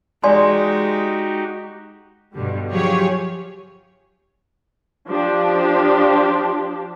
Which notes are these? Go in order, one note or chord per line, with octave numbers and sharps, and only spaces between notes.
G#3 D#4 F#4 G4 D5 G#5 C6
G2 B2 D3 G3
F3 F#3 F4 G4 G#4 C#5
F3 D4 G4